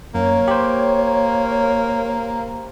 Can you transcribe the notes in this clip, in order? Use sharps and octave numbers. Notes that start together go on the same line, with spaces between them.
F#2 A#3 C#5
G4 C5